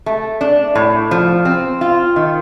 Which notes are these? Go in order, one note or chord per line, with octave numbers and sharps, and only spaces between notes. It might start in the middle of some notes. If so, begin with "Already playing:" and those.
A3
D4
A2
F3
C4
F4
D#3